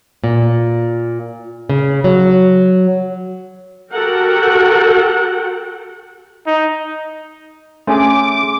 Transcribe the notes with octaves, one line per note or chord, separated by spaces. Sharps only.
A#2
C#3
F#3
F#4 G4 A4 A#4 F#5 G5
D#4
A3 C#4 G#4 G#5 C6 D6